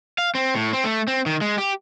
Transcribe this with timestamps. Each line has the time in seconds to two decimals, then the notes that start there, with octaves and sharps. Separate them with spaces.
0.18 F5
0.35 C4
0.55 A2
0.73 C4
0.84 A3
1.07 C4
1.26 D#3
1.41 G#3
1.58 G4